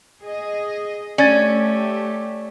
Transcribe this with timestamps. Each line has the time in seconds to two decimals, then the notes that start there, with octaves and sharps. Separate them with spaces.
0.19 G#4 D#5
1.18 A3 C#4 G4 D5 A6